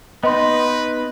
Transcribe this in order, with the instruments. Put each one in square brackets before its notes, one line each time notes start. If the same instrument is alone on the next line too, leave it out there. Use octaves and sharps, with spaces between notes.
[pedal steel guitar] B3 D#4 [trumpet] B4 [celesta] D#5 C6